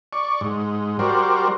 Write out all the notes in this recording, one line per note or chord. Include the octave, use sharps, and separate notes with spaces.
D5 C#6
G#2
G3 F#4 A#4 C5 D5